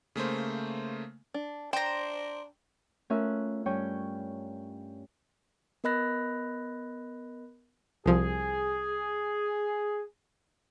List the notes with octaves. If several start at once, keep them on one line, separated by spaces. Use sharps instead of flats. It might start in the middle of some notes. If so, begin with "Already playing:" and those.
C#3 A3 A#3 C5
D4
D4 C5 G5 A#5
A3 C#4 F4 A#4 E5 F#6
G2 C#4 C#5 G5
B3 A#4 D#5 B5 F#6 A#6
C2 F3 G#4